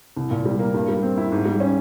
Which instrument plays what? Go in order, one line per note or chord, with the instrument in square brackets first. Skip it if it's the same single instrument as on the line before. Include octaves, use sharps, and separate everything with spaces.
[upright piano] C2
A#2
G3
A#3
G2
G3
C4
E4
G#2
G3
C#4